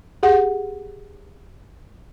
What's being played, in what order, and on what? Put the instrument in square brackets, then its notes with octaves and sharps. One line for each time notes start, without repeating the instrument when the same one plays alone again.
[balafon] G4 G#4 F#5